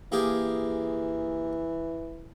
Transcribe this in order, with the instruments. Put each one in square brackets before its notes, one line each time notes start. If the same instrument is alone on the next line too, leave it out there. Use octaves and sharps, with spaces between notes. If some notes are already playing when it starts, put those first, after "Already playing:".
[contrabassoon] E3 [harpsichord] A#3 G4 G#4